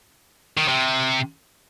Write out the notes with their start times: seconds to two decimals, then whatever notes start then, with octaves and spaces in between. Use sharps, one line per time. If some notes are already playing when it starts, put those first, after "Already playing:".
0.57 D#3
0.68 C3